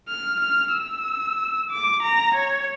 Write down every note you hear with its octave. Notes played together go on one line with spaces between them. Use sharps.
F6
F6
E6
D6
A#5
C#5